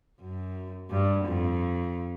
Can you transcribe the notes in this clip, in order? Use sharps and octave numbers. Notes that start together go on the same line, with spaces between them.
F#2
G2
F2